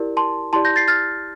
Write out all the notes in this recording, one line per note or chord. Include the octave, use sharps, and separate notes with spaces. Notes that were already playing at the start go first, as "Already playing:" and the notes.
Already playing: E4 G4 A#4 D5
A5 C6
E4 G4 D5 A5 C6
G6 A#6
A6 C7
F6 A6